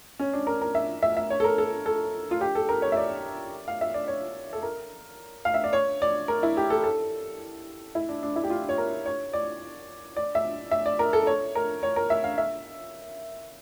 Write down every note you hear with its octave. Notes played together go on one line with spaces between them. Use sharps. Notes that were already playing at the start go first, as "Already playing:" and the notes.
C#4
D4
A#4
A#4
E5
E5
E5
C#5
A4
A#4
A4
A4
F4
G4
A4
A#4
C#5
E5
D5
F5
E5
D5
C#5
A4
A#4
F5
E5
D5
C#5
D5
A#4
E4
G4
A4
A4
E4
D4
D4
E4
G4
F4
C#5
A#4
C#5
D5
D5
E5
E5
D5
A#4
A4
C#5
A#4
C#5
A#4
E5
F5
E5